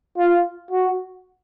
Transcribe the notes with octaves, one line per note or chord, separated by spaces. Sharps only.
F4
F#4